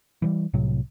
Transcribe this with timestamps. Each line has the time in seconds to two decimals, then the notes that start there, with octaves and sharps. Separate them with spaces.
0.22 E3 F3 G3
0.53 C2 A2 C3 F#3